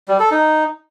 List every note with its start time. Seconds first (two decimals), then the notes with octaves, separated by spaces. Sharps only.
0.08 G3
0.20 A4
0.31 D#4